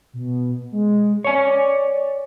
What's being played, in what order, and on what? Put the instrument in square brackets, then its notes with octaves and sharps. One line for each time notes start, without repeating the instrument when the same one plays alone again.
[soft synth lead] B2
G#3
[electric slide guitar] C#5 G#5 [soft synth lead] D5